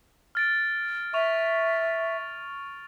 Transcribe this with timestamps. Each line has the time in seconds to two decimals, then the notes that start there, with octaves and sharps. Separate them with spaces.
0.35 F6 A6 D7
1.14 E5 C#6 F7